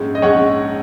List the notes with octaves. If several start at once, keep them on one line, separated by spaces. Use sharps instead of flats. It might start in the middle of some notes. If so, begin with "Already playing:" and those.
Already playing: A#1 G#2 G#3 C#4
D#5
A#1 G#2 G#3 C#4 C#5 F#5